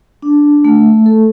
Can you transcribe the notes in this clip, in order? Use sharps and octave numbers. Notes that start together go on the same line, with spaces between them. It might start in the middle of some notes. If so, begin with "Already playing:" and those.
D4
A3
A4